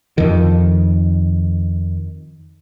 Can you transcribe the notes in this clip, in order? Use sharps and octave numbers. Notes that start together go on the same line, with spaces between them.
F2 D#3